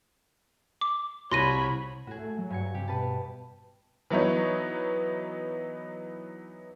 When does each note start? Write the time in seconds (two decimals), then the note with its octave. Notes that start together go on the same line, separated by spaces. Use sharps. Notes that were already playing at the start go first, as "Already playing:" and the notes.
0.81 D6
1.31 C2 C#5 B5 C6 A#6 D#7
2.07 A2 F#4 G#4
2.19 A3
2.38 F#3
2.50 G2 G#5 C#7
2.74 C3 G4
2.88 B2 B4 A5
4.10 E3 F#3 B3 D#4 C#5